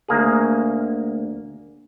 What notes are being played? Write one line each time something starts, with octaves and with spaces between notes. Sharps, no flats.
D2 A#3 G#4